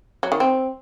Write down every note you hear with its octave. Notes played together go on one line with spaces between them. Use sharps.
F#3
D#3
C4